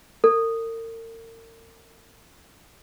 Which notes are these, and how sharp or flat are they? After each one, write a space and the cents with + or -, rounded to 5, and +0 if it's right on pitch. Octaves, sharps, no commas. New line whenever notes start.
A#4 -40